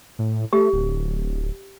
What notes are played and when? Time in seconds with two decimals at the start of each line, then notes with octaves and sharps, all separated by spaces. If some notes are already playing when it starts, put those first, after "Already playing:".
0.19 A2
0.53 A3 G4
0.73 D1